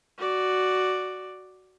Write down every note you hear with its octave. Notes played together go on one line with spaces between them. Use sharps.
F#4 D5